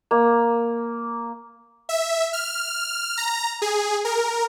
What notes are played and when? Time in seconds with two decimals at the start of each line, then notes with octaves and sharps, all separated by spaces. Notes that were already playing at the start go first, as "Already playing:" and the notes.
0.11 A#3
1.89 E5
2.33 F6
3.17 A#5
3.62 G#4
4.05 A#4